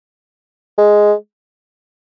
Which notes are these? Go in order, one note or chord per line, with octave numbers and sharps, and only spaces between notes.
G#3